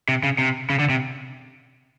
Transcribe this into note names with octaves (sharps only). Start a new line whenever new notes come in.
C3
C#3
C3
C#3
D3
C3